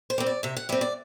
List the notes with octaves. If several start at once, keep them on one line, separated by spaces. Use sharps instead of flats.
C5
G3 C4
D5
C3 E5
F#5
G3 C4 E5
D5